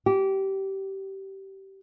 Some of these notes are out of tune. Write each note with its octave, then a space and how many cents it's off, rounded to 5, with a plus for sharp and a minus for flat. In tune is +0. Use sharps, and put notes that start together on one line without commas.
G4 -20